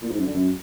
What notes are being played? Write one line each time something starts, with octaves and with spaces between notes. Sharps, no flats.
A#2
G#2
F#2
D3
F#2